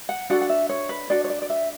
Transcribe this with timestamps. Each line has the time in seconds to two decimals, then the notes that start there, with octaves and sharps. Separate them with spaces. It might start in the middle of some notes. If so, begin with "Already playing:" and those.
0.09 F#5
0.30 D4 F#4 A4 F#5
0.41 F#5
0.49 E5
0.69 C#5
0.89 B4
1.10 D4 F#4 A4 D5
1.24 C#5
1.30 D5
1.42 D5
1.50 E5